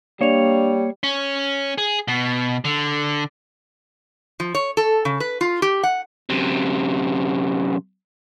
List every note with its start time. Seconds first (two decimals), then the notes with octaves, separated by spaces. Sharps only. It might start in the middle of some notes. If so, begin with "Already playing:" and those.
0.21 G3 A#3 D4 C#5 D5 F7
1.03 C#4
1.78 G#4
2.08 B2
2.65 D3
4.40 F3
4.55 C#5
4.77 A4
5.05 C#3
5.20 B4
5.41 F4
5.62 G4
5.83 F#5
6.30 F#2 C3